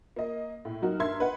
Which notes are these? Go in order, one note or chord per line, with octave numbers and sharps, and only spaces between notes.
A#3 D#5
A2
F#3 D#4 F#4 A#4
G2 A#4 E5 C6 G#6
B4 D#5 F#5